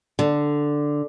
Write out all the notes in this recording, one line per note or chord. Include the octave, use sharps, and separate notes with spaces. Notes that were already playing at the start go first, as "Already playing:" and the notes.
D3